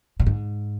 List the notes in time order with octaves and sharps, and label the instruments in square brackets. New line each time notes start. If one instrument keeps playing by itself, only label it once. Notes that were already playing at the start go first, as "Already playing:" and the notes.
[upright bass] A#2
G#2